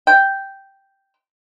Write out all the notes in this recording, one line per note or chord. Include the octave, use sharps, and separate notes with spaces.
G5